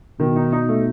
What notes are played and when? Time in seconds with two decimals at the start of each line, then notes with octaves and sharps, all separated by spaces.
0.20 B2 D#3
0.36 D#4
0.52 D#4
0.69 A3